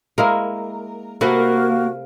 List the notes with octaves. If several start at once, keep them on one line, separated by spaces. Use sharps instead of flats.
G#3 A#3 E4 A#4
C3 A#3 F#4 A4 B4